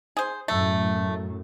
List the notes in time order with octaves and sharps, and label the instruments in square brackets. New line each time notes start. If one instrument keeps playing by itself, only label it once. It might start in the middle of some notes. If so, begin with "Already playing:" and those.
[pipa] G#4 C5
[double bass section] F#2 A2 [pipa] A3